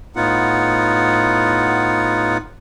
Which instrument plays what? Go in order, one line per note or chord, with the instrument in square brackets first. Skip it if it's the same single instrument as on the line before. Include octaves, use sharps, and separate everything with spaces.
[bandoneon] A2 B3 D#4 F4 F#5